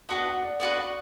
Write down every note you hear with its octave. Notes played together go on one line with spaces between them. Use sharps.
B3 D4 F#4 B4 F#5
F#5
D5
B3 D4 F#4 B4 D5
D5